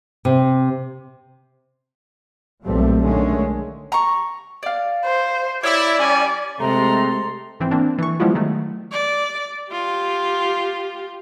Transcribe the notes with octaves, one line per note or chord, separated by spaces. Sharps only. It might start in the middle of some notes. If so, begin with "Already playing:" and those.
C3
B1 E2 A#2 G3 A3 C4
D3 D#3 G#3 A3 C#4
A#5 C#6
D5 F5
C5
E4 C#5 D5 E6
G3 C#4 G#5
C3 G#3 A3 A4 A#5 C6
G#1 E3 C4
A#3 C4 D4
E3 A4 C#6
F3 G3 G#3 B3 E4 F4
D#3 F#3 A3
D5
F4 G4